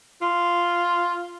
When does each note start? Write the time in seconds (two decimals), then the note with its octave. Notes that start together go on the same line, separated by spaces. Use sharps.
0.21 F4